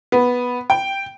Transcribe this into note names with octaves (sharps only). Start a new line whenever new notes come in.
B3
G5